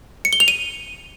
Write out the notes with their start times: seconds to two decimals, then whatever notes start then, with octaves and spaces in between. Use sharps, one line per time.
0.25 C#7
0.33 G7
0.40 F7
0.48 D#7